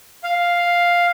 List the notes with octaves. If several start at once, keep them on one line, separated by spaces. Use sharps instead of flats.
F5